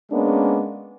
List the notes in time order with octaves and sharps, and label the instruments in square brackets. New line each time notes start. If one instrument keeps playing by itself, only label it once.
[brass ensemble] G#3 A#3 B3 C#4 D4